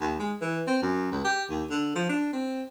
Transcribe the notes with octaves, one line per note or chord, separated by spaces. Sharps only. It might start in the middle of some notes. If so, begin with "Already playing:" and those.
D#2
G#3
E3
C4
F#2
C#2
G4
D#2
D3
F3
D4
C4